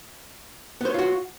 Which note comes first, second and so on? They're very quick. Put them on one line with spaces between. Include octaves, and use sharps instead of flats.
B3 C5 C#5 F4 F#4